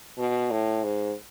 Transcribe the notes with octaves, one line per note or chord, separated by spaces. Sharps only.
B2
A2
G#2